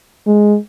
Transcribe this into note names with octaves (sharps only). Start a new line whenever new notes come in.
G#3